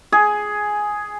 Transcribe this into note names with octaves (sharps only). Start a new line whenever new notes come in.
G#4